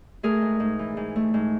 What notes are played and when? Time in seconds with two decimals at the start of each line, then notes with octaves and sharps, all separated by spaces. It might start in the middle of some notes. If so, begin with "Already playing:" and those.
0.23 A3 G#4 A#4
0.42 G#2
0.60 G#2
0.79 E3
0.97 G#2
1.16 A3
1.34 G#2